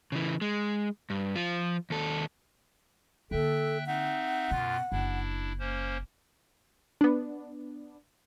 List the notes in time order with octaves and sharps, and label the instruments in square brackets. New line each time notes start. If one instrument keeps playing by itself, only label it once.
[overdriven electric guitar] C#3 E3
G#3
G2
F3 F4
D#2 A4
[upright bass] D3 A#3 [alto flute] A4 [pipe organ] E5 G5 F#6
[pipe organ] C4 D#4 E5 [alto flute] F#5
[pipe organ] F#2 F4 [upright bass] B2
[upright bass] F#1 [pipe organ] D4 E4
[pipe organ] A#3 C#4 C5
[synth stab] B3 D4